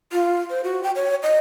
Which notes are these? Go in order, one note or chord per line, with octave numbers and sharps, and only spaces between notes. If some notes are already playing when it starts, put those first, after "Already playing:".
F4
C5
F#4
G5
C#5
D#5